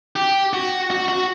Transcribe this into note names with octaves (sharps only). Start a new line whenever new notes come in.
G4
F#4
F#4
F#4